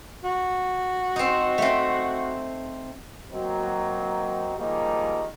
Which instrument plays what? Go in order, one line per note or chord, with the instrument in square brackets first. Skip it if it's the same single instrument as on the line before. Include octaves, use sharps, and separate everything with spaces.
[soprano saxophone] F#4
[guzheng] C4 D#4
A3 C4
[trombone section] F#3 A#3 C4 D#4 F#4
D#3 F3 G3 G#3 A#3